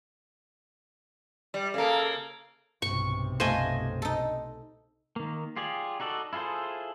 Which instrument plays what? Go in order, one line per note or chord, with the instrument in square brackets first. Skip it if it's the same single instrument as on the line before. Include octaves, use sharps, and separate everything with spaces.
[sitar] G3
[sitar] C#3 A#3 [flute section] A4 F5
[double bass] B1 C3 [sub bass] G2 [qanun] C#6
[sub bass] F#2 [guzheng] A3 F4 [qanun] C5 D#5 G#5
[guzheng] D#4 A4
[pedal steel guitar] D#3 A#3
F4 G4 G#4 D5
D#4 F#4 A4 D5
E4 F4 G#4 A4 C5